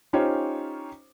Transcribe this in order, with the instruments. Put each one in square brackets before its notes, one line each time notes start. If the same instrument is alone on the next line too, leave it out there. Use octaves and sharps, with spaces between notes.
[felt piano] C#4 D#4 F4 G4 C5 C#5